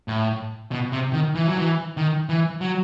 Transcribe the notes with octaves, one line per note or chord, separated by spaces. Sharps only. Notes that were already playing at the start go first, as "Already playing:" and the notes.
A2
B2
C3
D#3
E3
F#3
E3
D#3
E3
F#3